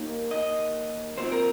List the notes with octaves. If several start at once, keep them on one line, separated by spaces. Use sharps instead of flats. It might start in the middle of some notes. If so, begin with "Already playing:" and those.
Already playing: D#2 D#3 A#3
D#5
C2 A#2 F3 C4 C5
A#4